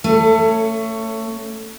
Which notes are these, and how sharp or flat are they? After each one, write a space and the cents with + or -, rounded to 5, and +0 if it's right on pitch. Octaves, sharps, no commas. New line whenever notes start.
A3 +25 C#4 +0